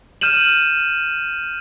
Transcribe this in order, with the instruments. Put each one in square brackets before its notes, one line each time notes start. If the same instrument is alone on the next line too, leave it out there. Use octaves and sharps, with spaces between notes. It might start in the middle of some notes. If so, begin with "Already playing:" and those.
[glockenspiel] F6 G6 D#7 E7 F#7